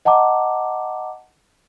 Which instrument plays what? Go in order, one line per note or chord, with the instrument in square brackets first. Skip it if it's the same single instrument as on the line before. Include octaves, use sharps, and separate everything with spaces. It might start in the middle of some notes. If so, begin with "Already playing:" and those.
[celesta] D#5 F#5 A5 A#5 D6